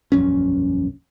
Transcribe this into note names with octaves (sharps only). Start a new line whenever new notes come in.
E1 A#1 F#2 C#4